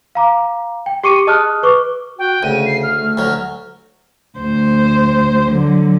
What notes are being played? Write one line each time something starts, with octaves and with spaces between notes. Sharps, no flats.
F5 A#5 D6
G5
G4 C#6 D6 C#7 D#7
G#4 D#5 A5 D#6 F6 F#6
B4 C#6 D6
F#4 G5
D2 C#3 D#7
C7
F6
A3
D2 F#3 F6
D2 C5
D3 F#3